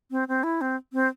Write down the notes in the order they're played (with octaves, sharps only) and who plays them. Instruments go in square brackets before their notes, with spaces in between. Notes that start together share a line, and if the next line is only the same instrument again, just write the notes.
[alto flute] C4
C4
E4
C4
C4